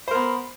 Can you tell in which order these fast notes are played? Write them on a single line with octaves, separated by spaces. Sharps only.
C5 A#4 B3